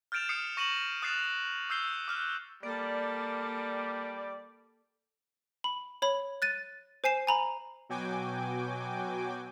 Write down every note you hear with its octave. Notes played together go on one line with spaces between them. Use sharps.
F6 G6 A6 D7 E7 F7
D#6 F6 C7 C#7
C#6 A#6 D#7 E7 F#7
D#6 F#6 A6 C7 E7 F7
D#6 E6 G6 C7 G7
D6 F6 F#6
G3 A#3 A4 D5
B5
C#5 B5
F#6 A6 D#7
C5 G#5 C7 E7
G#5 A#5 B5
B2 F#3 F#4 G5 G#5 D6